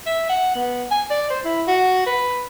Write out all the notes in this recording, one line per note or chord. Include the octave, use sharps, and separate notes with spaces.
E5
F#5
B3
G#5
D5
C5
E4
F#4
B4